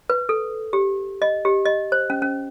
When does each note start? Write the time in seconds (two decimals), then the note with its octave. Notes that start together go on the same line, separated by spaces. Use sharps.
0.10 B4
0.29 A4
0.73 G4
1.22 D#5
1.45 G4
1.66 D#5
1.92 C5
2.10 C#4
2.22 C#4